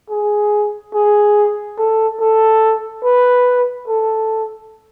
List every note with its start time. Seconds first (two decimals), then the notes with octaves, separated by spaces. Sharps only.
0.10 G#4
0.94 G#4
1.78 A4
2.20 A4
3.04 B4
3.88 A4